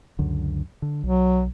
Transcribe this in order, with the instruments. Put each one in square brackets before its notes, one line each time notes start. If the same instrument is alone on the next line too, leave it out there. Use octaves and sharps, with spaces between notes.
[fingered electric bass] C#2 F#2 D3
D3
[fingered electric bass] B1 [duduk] F#3